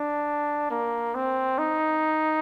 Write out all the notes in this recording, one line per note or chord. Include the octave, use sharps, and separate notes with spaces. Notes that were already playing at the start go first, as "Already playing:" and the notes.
Already playing: D4
A#3
C4
D#4